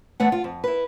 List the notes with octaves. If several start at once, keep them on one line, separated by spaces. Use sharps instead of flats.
E2 A3 B3 F#5
F4
F2
E4 B4